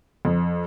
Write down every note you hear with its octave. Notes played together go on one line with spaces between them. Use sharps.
F2